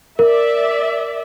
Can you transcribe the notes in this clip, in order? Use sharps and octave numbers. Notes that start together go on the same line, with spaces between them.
A#4 D5 E5